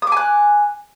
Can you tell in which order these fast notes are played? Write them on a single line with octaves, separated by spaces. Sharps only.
D#6 D6 G#5 F#6